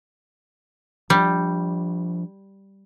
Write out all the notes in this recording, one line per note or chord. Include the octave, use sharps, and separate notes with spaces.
F3 G3 C4 D4